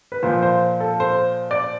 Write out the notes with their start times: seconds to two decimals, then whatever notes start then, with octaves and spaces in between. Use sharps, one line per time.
0.12 B4
0.23 A#2 F3 C5
0.42 C5
0.80 A4
1.00 C5
1.51 D5